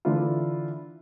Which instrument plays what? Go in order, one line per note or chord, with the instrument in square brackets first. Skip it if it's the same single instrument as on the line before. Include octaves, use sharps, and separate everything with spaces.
[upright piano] D3 E3 D4 E4 F4